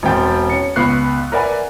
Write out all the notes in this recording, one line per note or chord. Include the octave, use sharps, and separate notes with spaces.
E1 C4 G5 A6
C#4 C#7
C#2 B3 C#6 F#6 C7
A#4 B4 D5 E5 F#5 G#5